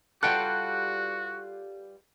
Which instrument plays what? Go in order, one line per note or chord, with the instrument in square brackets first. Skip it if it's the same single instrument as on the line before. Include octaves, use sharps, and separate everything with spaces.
[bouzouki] G3 F4 B4 [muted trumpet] F#4 [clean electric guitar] A4 F#5 G5 [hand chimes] F#6